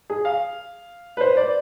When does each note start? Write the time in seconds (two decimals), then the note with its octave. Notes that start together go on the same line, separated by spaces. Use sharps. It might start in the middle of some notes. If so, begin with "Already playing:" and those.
0.10 G#4
0.25 F5
1.17 B4
1.21 C5
1.37 D5